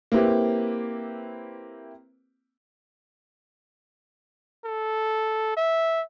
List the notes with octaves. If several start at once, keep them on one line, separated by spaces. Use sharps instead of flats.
A#3 C4 E4 G4 B4
A4
E5